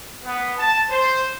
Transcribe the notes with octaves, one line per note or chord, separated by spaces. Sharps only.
B3
A5
C5